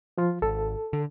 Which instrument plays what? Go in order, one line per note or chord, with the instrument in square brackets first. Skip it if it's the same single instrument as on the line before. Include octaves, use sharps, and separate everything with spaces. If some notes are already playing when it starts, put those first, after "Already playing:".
[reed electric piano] F3 F4
[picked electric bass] G#1 [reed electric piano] A4
[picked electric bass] D3